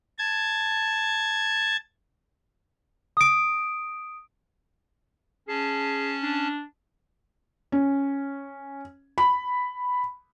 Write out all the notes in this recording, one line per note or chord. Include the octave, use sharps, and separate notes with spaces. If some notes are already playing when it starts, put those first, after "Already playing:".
A5 G#6
D#6 D7
C#4 G#4 A5
D4
C#4
B5